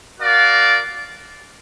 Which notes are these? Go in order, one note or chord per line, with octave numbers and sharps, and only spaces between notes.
F#4 A#4 D5 F5